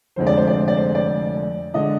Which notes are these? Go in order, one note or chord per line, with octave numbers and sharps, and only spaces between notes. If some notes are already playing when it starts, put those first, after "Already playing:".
F1 F2 D3 G#3 C5
D5
C5
D5
C5
D5
C5
D5
D3 G#3 D4 D#5